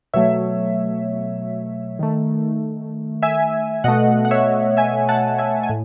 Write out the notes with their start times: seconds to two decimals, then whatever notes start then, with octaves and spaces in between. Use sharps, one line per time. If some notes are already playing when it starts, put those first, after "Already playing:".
0.14 B2 F#3 A3 C#5 E5
1.99 D#3 A3
3.22 E5 G#5
3.84 B2 A3 D#5 F#5
4.25 F#5
4.31 C#5 E5
4.77 E5 G#5
5.09 F#5 A5
5.38 E5 G#5
5.63 G#5
5.69 A2